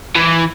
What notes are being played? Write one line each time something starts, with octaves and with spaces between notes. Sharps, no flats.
E3